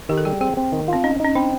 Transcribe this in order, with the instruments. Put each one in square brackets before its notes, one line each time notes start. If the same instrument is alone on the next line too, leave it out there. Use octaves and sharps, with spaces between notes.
[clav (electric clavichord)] D#3 [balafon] G4
[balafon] A4
[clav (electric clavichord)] G3 [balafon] G#4
[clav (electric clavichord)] C4 [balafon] G#4
[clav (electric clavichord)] C4
D#3
[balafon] C4 [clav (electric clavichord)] F4
[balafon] C#4 [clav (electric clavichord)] D#4
[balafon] C#4 [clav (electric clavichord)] D#4
[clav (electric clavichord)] C4 [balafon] D4